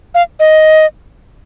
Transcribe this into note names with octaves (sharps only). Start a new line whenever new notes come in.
F5
D#5